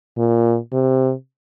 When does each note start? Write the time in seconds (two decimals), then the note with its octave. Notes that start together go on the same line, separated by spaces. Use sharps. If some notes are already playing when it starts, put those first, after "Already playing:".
0.18 A#2
0.73 C3